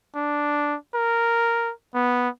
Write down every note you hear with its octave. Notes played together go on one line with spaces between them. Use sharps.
D4
A#4
B3